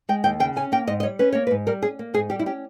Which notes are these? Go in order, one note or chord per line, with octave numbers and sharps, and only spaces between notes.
G#3 G5
D#2 G5
C#3 G5
C#4 G#5
A#3 G5
G#2 D#5
D#5
G3 C#5
C#4 B4
A#3 C#5
B4
G#2
G3 A#4
C#4 G#4
A#3
G#2 G#4
G3 G4
E4
C#4 G4